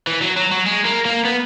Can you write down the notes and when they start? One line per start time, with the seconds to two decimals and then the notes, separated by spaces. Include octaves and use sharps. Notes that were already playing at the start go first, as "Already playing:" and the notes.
0.07 E3
0.22 F#3
0.37 F#3
0.52 F#3
0.66 G#3
0.85 A#3
1.05 A#3
1.25 B3